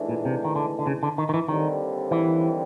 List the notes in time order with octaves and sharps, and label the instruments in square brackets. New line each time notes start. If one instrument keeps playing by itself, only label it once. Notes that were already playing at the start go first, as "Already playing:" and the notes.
Already playing: [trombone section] G#2 E3 A3 D4
[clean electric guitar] A#2
C3
D#3
D3
D3
C#3
D3
D#3
D#3
E3
[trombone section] D#2 D3 G3 C4 [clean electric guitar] D#3
[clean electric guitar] E3